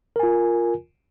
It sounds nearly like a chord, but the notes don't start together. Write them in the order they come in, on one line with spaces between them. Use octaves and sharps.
A#4 G#5 F4